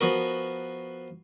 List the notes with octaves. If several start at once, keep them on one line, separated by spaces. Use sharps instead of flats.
F3 B3 F#4 A#4